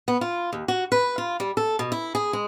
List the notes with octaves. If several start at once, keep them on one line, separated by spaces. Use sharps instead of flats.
B3
F4
D#2
F#4
B4
F4
G3
A4
B2
E4
G#4
G#3